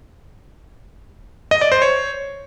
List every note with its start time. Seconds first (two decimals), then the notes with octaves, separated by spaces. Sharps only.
1.51 D#5
1.61 D5
1.72 C5
1.82 C#5